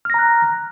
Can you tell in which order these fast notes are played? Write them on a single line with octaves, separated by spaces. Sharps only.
F6 A#6 A#5 F#6